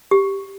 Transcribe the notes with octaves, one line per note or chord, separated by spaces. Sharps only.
G4